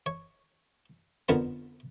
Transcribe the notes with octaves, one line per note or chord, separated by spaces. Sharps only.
C#5
F2 D3 B3 A#4 C5 A5